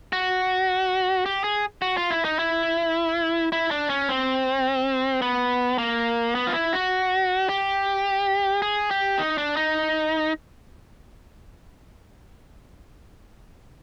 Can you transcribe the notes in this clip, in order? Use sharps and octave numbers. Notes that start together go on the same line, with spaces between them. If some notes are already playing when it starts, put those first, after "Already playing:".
F#4
G4
G#4
F#4
F4
E4
D#4
E4
E4
D4
C#4
C4
B3
A#3
B3
F4
E4
F#4
G4
G#4
G4
D#4
D4
D#4